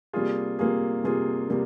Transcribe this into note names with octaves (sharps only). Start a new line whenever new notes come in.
C3 G3 A#3 F4 G#4
C3 G3 A#3 F4 G#4
C3 G3 A#3 F4 G#4
C3 G3 A#3